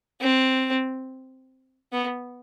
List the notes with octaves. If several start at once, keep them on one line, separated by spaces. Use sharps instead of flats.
C4
B3